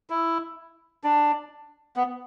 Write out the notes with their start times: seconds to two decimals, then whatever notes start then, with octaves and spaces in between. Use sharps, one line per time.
0.10 E4
1.04 D4
1.96 B3